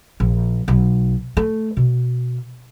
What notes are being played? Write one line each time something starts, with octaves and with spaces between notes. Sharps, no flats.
A#1
B1
A3
B2